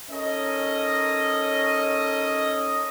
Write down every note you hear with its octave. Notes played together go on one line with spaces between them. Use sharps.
C#4 D#4 A4 A#4 D#5